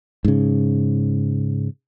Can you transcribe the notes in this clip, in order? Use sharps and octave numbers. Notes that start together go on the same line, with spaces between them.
G#2 C#3